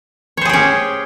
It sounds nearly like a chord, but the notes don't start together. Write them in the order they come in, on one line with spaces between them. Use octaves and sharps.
C#5 C5 G#4 G4 C#4